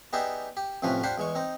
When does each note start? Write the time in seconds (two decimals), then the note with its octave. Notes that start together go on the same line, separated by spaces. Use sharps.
0.13 B3 D#4 G4 G#4 D5 E5
0.57 G4
0.82 F2 A2 C3 F3 C#4 B4
1.03 D4 F4 G4 C5 F#5 B5
1.18 E2 G#3 C#6
1.35 C4 D#4